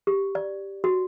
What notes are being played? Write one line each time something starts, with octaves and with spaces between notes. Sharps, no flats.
G4
D5
F#4